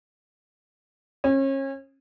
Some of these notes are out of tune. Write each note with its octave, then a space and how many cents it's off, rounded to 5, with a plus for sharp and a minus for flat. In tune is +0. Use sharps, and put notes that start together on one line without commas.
C#4 -35